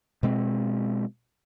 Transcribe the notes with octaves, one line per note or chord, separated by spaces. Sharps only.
B2 G#3 C4